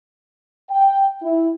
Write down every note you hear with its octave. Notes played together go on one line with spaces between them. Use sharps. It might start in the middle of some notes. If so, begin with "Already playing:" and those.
G5
E4